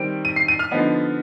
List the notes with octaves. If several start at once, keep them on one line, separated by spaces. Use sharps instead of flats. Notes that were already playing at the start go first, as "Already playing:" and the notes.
Already playing: D#3 G3 C4 D7
D#7
C7
D#7
F6
D3 F3 B3 D#4